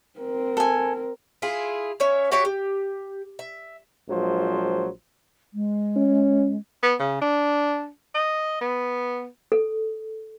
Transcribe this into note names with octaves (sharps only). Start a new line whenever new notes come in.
C4 A#4
A4 G#5
E4 F4 G#4
C#4 C#5 E5
F#4 G4 C#5 E5
G4
E5
A#1 F3 F#3 G#3 C5
G#3
C#4
B3
C#3
D4
D#5
B3
A4